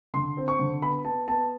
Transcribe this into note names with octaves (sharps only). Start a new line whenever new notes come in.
D3 C6
C4
C#6
D3
B3 B5
B3 A5
B3 A5